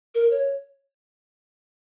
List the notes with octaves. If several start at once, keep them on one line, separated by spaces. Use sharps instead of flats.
A#4
C#5